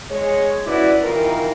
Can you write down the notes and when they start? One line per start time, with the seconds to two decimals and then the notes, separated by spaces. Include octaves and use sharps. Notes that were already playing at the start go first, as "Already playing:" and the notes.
0.10 G#3 C#5
0.66 C#4 E4 F#4 B4 D5
1.02 C3 D#3 E3 D#4 F4 A#4